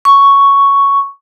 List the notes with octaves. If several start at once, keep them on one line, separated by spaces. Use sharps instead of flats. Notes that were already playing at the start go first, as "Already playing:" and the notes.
C#6